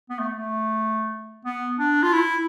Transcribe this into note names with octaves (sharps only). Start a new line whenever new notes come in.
B3
A3
A3
B3
D4
F4
E4